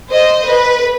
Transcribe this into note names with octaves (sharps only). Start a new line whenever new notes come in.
C5 D#5
B4